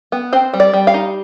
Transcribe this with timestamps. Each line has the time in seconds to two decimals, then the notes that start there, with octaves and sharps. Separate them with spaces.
0.12 B3
0.33 C4 C5
0.53 G3
0.60 D5
0.74 G3
0.87 F5
0.94 D#4